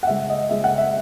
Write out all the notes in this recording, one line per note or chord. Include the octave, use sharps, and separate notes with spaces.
F#5
C#3 G#3 E5
D#5
C#3 G#3 E5
F#5
E5